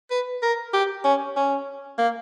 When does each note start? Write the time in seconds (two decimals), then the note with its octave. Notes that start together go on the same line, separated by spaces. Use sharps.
0.10 B4
0.42 A#4
0.73 G4
1.04 C#4
1.36 C#4
1.98 A#3